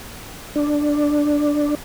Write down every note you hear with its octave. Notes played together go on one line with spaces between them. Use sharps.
D4